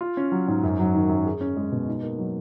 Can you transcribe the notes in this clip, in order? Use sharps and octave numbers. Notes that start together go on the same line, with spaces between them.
F4
C#4
F#3
G#2
F#2
F#3
D#3
F#2
G#4
C#4
G#3
B2
D#4
A#3
F#3